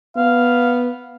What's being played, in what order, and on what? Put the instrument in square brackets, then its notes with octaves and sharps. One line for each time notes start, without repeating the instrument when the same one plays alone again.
[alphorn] B3 [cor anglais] F5